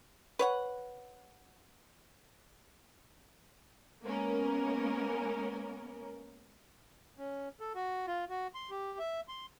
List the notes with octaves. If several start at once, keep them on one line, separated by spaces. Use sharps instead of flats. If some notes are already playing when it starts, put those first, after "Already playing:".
B4 C#5 F#5
G#3 A#3 B3 C#4 A#4
C#4
A4
F#4
F4
F#4
C6
G4
E5
C6